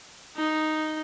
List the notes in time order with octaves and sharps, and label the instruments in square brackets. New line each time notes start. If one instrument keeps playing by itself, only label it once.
[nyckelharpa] D#4